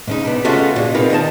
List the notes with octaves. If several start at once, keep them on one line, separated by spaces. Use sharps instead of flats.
G#2 C#3 D#4
B3 D4
C#3 G#3 A3 C#4 F4 F#4
A#2 G#3
C4 D#4 F4 G#4 A#4 B4
D#3 D#5 G5 A5